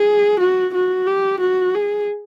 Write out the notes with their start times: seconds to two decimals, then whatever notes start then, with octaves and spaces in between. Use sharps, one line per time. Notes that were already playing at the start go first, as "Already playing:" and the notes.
Already playing: G#4
0.40 F#4
0.75 F#4
1.07 G4
1.41 F#4
1.75 G#4